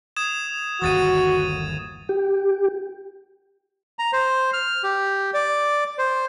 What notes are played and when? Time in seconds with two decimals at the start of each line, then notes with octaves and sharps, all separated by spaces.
0.16 D#6 G#6 E7
0.82 G1 D#2 E3 F#4 D#6 A6 D#7
2.09 G4
3.99 A#5
4.13 C5
4.53 F6
4.84 G4
5.34 D5
5.98 C5